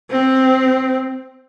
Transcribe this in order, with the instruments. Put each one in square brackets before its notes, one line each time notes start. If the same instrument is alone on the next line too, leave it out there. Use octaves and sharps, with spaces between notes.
[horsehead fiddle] C4